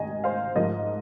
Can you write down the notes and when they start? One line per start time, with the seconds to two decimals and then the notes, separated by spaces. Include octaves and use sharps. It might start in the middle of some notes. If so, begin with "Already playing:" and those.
Already playing: G#2 D#3 D#5 G#5
0.24 C5 F5
0.55 G#2 F3 A#4 D#5